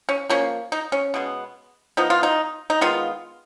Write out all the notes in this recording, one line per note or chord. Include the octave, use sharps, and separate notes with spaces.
C#4
F3 A#3 C#4
D#4
C#4
B2 G#3 B3
F3 B3 D#4
F4
D#4
D#4
D#3 G#3 B3 F4